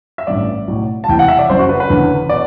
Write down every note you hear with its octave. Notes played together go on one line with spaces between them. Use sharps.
E5
A1 G2 F#3 D5
B1 A2 F#3
A5
E1 E2 C3 E3 G5
F#5
E5
D5
F#1 F#2 F#3 C5
F#4
B4
B4
F#1 E2 D3 F#3
B2 D5